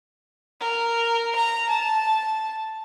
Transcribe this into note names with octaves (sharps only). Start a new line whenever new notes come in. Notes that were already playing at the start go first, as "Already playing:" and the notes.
A#4
A#5
A5